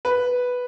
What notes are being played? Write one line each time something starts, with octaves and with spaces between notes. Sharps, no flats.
B4